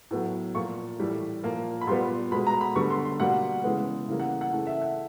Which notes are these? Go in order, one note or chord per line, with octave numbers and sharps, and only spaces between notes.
A2 F#3 B3
A#2 F3 A#3 C#6
A2 E3 G3
A#2 F3 A#3
B5
A#2 G3 B3 C6
B2 G#3 B3 B5
A#5
B5
D3 G3 B3 C#6
C6
C6
B2 G3 A#3 F#5
C#3 E3 G#3 B3
C#3 E3 G3 A#3
F#5
F#5
C#3 E3 A3
E5
F#5